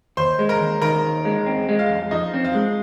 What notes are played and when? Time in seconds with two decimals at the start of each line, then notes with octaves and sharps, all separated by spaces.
0.17 D#2 C5 C6
0.39 G#3
0.49 A#4 A#5
0.60 D#2
0.82 D#3 A#4 A#5
1.04 D#2
1.25 G#3
1.46 C4
1.69 G#3
1.79 F4 F5
1.89 F2
2.11 F3 D#4 D#5
2.34 C4
2.44 F4
2.55 G#3